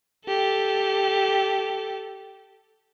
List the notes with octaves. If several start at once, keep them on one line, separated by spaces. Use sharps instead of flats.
G4 A4